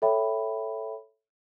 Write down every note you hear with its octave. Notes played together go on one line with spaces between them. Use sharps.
A4 C#5 E5 G5 B5